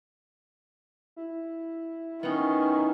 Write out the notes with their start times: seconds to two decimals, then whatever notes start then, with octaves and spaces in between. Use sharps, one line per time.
1.16 E4
2.23 D#3 B3 C#4 D#4